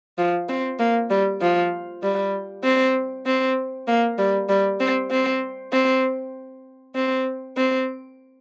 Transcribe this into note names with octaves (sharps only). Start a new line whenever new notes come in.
F3
C4
A#3
G3
F3
G3
C4
C4
A#3
G3
G3
C4
C4
C4
C4
C4